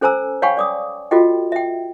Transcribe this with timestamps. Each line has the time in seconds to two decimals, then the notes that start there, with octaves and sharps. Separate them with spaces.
0.01 C#4 A4 C5 G#5 A#5 E6
0.42 C#5 F5 G5 G#5 B5 C#6
0.57 D5 D6 D#6
1.11 F4 F#4 A4 D#5 G5
1.52 E5 G5